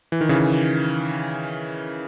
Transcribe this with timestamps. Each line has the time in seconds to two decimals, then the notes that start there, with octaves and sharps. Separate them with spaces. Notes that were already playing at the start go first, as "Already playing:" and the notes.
0.12 E3
0.21 D#3
0.29 C#3 E3